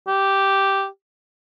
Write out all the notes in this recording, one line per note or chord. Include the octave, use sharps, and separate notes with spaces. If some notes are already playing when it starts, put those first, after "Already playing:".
G4